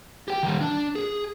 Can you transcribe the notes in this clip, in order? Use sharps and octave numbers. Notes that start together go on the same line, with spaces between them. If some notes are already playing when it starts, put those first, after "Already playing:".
G4 G5
D#3 G3
D4
G#4